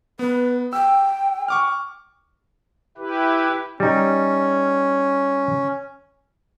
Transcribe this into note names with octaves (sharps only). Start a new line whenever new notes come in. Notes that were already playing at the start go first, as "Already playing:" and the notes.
B3 B4
G5 E6
C#6 D6 F6
E4 G4 B4
G3 C#4 D#4